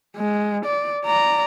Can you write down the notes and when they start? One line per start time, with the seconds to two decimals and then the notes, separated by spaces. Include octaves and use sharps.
0.17 G#3
0.65 D5
1.05 D5 A#5